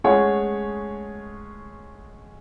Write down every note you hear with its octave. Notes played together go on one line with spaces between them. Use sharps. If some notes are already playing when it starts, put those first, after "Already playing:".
G#3 A3 C#4 G#4 C#5 F#5